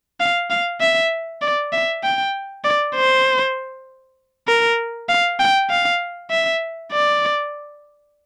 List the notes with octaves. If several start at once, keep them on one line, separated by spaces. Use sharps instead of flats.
F5
F5
E5
D5
E5
G5
D5
C5
A#4
F5
G5
F5
E5
D5